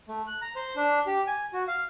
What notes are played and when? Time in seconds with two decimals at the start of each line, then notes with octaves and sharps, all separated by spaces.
0.08 A3
0.27 F#6
0.41 A#5
0.56 C5
0.76 D4
1.07 G4
1.27 G#5
1.53 F#4
1.68 F5